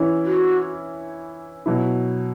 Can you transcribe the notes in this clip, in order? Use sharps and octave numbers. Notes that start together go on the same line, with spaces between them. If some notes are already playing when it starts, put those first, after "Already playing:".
Already playing: E3 C#4 E4
F#4
B2 F#3 E4